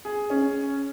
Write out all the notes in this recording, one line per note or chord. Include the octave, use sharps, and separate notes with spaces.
G#4
C#4